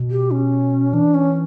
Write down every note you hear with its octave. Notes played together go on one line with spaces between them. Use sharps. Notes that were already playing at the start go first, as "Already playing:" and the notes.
Already playing: B2
G4
C#4
E3 D4
C#4